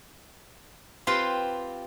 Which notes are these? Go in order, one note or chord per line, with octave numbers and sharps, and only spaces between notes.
C4 F4 G4 B4 C5